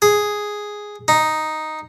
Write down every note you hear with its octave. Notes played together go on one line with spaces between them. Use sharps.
G#4
D#4